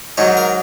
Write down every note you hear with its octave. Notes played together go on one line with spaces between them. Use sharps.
G#2 D#3 F#3 C#5
A#4